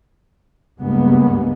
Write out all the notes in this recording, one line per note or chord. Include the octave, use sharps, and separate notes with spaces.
C#2 G2 C#3 G#3 A#3 B3